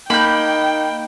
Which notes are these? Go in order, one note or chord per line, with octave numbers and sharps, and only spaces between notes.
A#3 D#4 G5 B5 G6